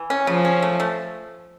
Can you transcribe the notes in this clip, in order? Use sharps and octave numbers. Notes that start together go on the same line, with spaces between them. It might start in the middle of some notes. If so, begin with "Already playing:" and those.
Already playing: E3
C#4
C#3 F3
C#4
A3
A3